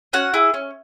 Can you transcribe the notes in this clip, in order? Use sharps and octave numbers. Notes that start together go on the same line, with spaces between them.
C#4 F#4 F#5
E4 G#4
C#4